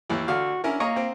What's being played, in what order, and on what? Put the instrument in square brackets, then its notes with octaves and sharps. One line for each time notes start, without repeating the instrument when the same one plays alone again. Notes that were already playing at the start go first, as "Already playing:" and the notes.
[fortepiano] D#2 E3
[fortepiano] D3 F5 [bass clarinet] F#4
[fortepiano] C#4 E4 A#4 [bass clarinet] D4
[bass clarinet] A#3 [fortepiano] C#5 D#5 A#5
[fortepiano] C4